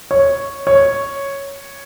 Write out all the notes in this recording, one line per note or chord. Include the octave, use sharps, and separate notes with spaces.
C#5
C#5